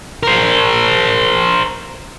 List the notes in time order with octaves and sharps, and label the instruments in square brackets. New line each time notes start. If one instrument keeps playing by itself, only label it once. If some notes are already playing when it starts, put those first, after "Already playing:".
[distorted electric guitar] A#4 C5